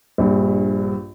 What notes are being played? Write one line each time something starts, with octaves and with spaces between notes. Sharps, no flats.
A#1 G2